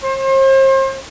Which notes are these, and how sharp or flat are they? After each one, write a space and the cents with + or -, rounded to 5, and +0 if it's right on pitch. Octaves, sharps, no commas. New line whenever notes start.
C5 +40